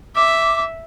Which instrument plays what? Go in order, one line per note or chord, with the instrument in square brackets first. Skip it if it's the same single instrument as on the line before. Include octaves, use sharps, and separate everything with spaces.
[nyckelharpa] E5 [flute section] D6